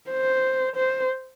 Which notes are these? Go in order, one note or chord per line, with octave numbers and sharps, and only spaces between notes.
C5
C5